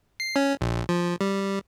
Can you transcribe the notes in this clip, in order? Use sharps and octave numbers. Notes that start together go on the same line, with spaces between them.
C7
C#4
A#1
F3
G3